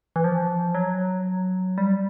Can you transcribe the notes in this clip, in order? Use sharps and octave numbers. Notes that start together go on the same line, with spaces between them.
E3
F3
F#3
G3